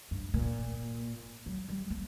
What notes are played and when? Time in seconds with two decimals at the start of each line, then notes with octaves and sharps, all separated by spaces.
0.11 G2
0.34 A#2
1.46 F#3
1.69 G3
1.90 A#3